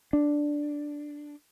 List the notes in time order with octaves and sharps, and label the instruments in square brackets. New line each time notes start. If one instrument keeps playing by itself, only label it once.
[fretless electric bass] D4